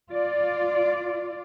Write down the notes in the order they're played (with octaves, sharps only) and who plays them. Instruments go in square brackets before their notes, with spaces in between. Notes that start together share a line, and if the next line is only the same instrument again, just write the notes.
[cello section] F4 D5